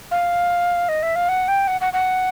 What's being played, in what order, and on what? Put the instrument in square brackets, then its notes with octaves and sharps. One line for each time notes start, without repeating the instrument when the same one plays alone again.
[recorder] F5
D#5
E5
F5
F#5
G5
F#5
F#5
F#5